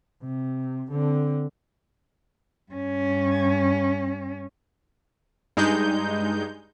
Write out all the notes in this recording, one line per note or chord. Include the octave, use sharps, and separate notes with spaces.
C3
D3 C4
G2 C#4
G2 G#3 D#4 G6